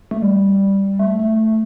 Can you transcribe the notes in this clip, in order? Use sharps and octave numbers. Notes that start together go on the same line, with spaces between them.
A3
G3
A3
A3
A3